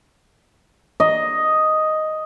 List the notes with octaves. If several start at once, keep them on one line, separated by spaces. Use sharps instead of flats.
D#5